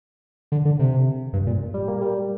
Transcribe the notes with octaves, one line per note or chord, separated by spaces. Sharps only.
D3
D3
C3
G2
A#2
G3
A#3
G3